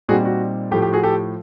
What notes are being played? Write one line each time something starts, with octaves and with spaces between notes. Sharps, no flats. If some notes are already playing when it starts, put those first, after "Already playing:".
A#2 G3 C4 D#4 F#4 G#4
F#4
A2 F3 A3 G4
G4
F#4 G#4
G4 A4